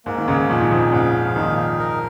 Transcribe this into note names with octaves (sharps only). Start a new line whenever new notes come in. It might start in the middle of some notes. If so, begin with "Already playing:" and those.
G#2 A#3
D#3
G#2 C#3
F2 A#2 D#4
G#2
F2 A#2
G#2 C#3 F5
F3
A#2 D#3 D#4
A#4